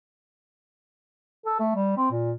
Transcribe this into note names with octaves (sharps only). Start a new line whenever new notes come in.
A4
A3
G3
C4
A#2